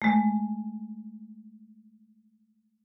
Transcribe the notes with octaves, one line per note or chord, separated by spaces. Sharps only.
G#3 A3